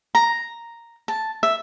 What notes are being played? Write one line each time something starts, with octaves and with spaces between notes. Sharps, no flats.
A#5
A5
E5